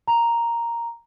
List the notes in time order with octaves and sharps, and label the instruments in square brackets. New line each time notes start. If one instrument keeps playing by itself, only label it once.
[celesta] A#5